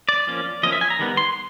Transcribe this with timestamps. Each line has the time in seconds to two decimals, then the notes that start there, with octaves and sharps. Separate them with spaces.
0.09 D5
0.27 F3 A#3 C#4
0.63 F3 A#3 C#4 D#5
0.72 E5
0.81 G#5
0.90 A#5
0.99 D#3 G3 B3
1.17 C6